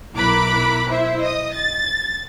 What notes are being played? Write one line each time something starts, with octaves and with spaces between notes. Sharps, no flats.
B1 E4 A#4 B5 D6 F#6
E4 C5 E5
D#5 D#6
A6